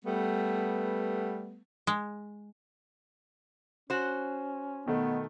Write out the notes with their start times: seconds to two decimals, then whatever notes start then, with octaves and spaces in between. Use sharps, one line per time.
0.05 G3 A3 B3
1.87 G#3
3.90 C#4 F#4 C5
4.86 B2 D#3 A3 B3